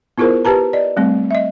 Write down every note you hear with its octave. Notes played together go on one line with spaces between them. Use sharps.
B3 E4 F4 G#4 A#4 C5
G4 B4 A5 A#5
D5 D#5
G3 A3 C4
D#5 E5